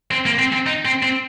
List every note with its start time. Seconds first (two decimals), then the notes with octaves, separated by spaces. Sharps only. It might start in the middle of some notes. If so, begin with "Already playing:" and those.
0.11 C4
0.26 A#3
0.39 C4
0.52 C4
0.66 D#4
0.85 C4
1.03 C4